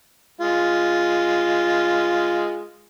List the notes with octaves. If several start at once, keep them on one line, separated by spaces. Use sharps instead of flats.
G#3 F4